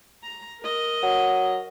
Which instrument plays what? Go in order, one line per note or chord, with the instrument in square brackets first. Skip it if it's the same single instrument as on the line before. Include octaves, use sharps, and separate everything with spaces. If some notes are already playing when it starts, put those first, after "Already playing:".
[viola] A#5
A#4 D#5
[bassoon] F#3